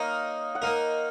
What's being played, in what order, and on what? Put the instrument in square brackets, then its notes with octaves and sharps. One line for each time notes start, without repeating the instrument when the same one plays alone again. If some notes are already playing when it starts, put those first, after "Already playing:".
Already playing: [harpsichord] A#3 D#4 A#4 [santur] C#5 D#5 F5
[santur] F#5
[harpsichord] A#3 D#4 A#4 [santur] F5